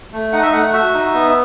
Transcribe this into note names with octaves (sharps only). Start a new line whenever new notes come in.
A3
D#4 F#5
E5
A3 F#5
F#5
F#4 E5
D#4
B3